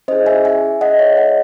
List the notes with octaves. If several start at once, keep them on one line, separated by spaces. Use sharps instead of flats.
C#4 E4 G#4 C5 D#5
E5 G#5
E5 G#5
C#4 G#4 D#5 F#5
C#5 E5
D#5 F#5